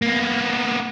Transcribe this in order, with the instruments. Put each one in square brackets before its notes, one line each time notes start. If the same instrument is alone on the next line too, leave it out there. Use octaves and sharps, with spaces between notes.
[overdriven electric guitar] A#3 B3